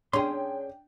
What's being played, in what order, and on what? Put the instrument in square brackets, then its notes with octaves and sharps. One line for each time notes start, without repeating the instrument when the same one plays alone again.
[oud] C#4 G#4 [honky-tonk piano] D4 G5 [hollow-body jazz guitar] C6